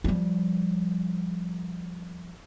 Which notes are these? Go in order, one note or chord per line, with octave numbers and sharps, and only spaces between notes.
F3 G3